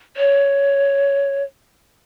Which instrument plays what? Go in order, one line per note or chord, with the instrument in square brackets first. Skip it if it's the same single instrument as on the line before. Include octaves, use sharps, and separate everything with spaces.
[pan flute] C#5